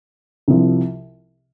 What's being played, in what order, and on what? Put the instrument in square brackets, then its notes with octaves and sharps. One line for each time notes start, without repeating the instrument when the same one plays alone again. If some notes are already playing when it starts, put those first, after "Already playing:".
[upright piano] C2 C3 F3